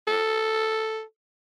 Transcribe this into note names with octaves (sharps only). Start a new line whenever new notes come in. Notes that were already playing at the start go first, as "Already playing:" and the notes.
A4